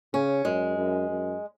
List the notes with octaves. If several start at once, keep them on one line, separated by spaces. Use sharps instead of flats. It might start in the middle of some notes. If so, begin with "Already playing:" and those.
C#3 C#4
F#2 G#3
F#2
F#2